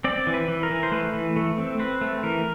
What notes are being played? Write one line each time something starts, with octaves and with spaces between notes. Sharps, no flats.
C4 D5
E3
B4
E3
A#4
E3
C5
A3 B4
E3
A3
C4
C4 B4
A3
E3 A#4